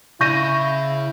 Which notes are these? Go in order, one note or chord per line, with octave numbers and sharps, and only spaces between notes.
C#3 E4 C#6 G6 A#6 D#7